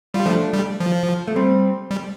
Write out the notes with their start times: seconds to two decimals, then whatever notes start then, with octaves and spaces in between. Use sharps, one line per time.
0.14 G3 F4
0.26 F3 A3 D4
0.53 G3
0.80 F3
1.28 A3
1.36 G3 C4
1.91 G3